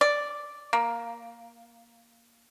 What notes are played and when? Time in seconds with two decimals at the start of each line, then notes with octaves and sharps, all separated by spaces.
0.01 D5
0.73 A#3